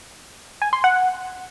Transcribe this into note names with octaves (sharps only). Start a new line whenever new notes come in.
G#5
C6
F#5